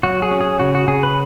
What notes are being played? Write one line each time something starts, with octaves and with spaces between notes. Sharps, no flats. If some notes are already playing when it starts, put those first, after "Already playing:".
F#3 F#4
G#4
C#4
G#4
C#3 F#4
F#4
C#3 G#4
B4